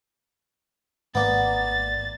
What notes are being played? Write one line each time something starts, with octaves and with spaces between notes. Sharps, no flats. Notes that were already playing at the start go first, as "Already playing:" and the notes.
G#1 A#3 B3 D5 A6